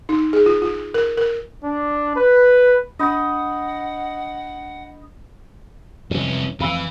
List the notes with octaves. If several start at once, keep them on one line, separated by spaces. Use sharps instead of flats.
D#4
G#4
F4
F4
A#4
A#4
D4
B4
D4 D#5 F#5 B5 G6
C2 F2 E3 C#4
F2 E3 F5 B5 E6